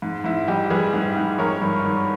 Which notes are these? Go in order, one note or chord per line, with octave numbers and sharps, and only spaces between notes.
G#2
G#2 E4
G3 D#4 G4
G3 G#4 B4
G#2
G#2
G#3 A#4 C#5
G2
D#3